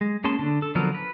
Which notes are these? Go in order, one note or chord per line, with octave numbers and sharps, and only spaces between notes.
G#3
A#3 C#4 G#4 A5 C6
D3 D4
A4
D3 F3 F#3 B3 A#4
B4